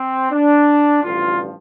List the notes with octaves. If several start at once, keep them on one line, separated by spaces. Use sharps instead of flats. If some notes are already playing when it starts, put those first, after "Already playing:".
Already playing: C4
D4
A1 G2 D3 F3 F4